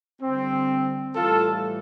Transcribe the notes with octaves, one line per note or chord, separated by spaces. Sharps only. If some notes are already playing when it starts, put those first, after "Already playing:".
D3 G3 C4
A2 E3 G3 F4 A4